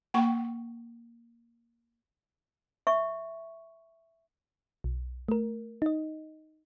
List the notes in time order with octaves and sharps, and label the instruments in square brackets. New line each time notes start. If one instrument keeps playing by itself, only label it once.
[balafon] A#3 F#5 G5 B5 C#6
[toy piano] E5 C#6
[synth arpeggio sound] B1
A3 A#4
D#4 D#5